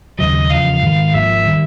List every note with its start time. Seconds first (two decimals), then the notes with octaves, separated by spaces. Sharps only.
0.19 D#2 C#3 F#3 D#5
0.50 E2 C#3 F3 F5
0.82 G#2 D#3 G#3
1.13 G#1 G#2 F3 A#3 E5
1.46 D#3 G3